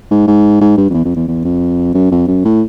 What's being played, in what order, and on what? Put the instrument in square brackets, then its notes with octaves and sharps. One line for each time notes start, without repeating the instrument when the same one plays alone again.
[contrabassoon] G#2
G#2
G#2
G2
F2
E2
F2
E2
E2
F2
F#2
F2
F#2
A2